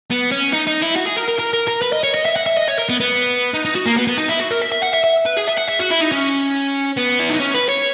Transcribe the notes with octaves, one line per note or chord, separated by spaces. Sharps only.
B3
C#4
D#4
D#4
E4
F#4
G#4
A#4
A#4
A#4
A#4
A#4
B4
D#5
C#5
D#5
E5
F#5
E5
D#5
C#5
A#4
B3
B3
D#4
D#4
F#4
A#3
B3
B3
D#4
E4
F#4
A#4
E5
E5
F#5
E5
E5
B4
G#4
E5
F#5
E5
F#4
E4
D#4
C#4
B3
E4
D#4
C#4
B4
C#5